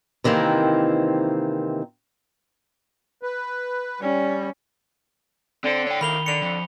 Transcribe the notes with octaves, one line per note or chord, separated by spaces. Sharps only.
C3 D#3 E3 A#3 C4
B4
G3 C#4
D3 C4 C5
C#5 G5
D2 A2 D#3 A#3 B5 F7 G7
D3 C#7 F7
F2